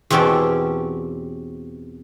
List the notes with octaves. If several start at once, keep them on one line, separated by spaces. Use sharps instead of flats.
E2 B2 C4 C#4 G4 A4